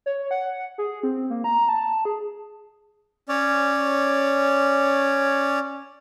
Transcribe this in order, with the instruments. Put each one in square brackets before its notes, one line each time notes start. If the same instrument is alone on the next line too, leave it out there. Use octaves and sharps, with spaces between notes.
[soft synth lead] C#5
F#5
G#4
C4
A#3
A#5
A5
G#4
[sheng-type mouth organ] C#4 C#5 D5